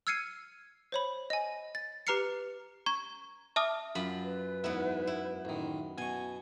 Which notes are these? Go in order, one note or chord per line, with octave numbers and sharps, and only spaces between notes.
E6 F6 G#6 C7 C#7 D#7
C5 C#5 B5
D#5 G#5
A6
G4 B4 A#5 F6 C7 C#7
A#5 C#6 G#6
E5 A5 D6 D#6 F6
F#2 F4 B5
B4
E2 G#2 B3 E4
E4
A1 D#3
B2 G#5 C#6